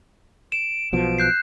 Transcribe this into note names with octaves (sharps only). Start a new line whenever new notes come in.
D7 E7
B1 B2 F3 D7
F#6 G6 C7